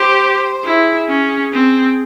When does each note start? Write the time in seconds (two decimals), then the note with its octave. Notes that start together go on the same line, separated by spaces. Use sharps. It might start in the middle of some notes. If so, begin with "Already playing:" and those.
Already playing: G4 C5
0.64 E4 G#4
1.09 C#4
1.53 C4